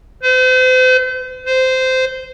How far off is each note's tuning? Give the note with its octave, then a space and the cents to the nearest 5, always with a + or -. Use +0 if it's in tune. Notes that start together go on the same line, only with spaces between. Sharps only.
C5 -40
C5 -15